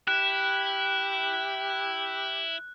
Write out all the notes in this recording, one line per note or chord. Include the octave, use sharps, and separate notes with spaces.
E4 G4 F#6